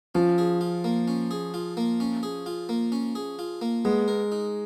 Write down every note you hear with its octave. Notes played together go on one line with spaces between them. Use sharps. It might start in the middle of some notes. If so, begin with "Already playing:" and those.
F3 C#4
G#4
F4
A#3
C#4
G#4
F4
A#3
C#4
G#4
F4
A#3
C#4
G#4
F4
A#3
G#3 B3
A#4
D#4